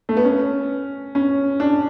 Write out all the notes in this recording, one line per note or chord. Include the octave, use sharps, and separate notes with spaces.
A3
B3
C#4
C#4
D4